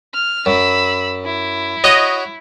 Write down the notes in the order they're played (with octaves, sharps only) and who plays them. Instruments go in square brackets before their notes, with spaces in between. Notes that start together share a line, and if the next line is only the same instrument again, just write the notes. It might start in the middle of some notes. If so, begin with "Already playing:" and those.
[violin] F6
[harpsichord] F#2 [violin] B5 E6
[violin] E4
[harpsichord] F#4 C#5 [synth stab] D#5